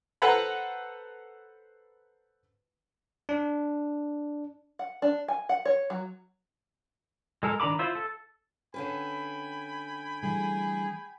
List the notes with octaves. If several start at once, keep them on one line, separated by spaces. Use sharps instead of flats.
A4 B4 C5 F#5 A#5 B5
D4
F#5
D4
G#5
F#5
C#5
F#3
G#3 A4 A#4
D#3 D4 A#5 B5 D6
E4 F4 C5 E5
A4
D3 C#4 B4 G5 G#5 B5
E3 G3 A3 G#4